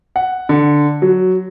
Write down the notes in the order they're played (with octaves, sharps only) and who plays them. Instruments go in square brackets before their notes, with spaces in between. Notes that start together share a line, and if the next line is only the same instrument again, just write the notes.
[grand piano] F#5
D3
F#3